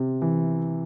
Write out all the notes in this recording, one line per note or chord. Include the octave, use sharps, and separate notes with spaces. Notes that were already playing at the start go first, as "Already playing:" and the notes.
Already playing: C3
E3